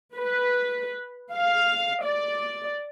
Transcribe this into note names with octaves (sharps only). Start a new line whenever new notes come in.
B4
F5
D5